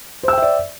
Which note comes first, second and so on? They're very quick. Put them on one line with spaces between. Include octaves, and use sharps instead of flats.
C5 E6 G5 E5 D5